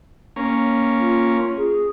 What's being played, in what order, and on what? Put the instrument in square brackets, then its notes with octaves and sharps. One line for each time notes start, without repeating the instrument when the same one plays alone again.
[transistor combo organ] A#3 C#4
[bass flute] F4
G#4